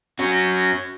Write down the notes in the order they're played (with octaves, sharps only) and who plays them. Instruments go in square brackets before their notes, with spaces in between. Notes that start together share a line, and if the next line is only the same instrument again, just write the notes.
[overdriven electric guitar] C#4 F#4